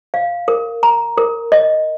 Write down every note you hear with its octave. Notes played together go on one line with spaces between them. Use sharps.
F5
A#4
A#5
A#4
D#5